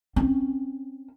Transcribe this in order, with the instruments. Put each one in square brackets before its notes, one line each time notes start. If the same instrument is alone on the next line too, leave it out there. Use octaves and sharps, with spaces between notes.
[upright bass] C4 C#4